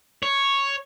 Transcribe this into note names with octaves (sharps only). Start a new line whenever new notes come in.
C#5